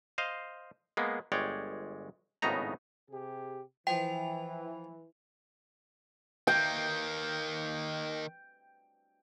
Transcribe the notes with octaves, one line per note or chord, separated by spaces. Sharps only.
C5 D#5 F5
G#3 A#3 B3
G1 G#3 C#5 D5 G5
G#1 A2 C#3 B3 D#4 A#5
C3 G4 G#4
E3 F3 F4 G5
D#3 A#3 G5